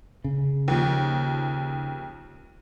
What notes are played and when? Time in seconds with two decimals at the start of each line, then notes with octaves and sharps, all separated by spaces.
0.24 C#3
0.68 D#2 F3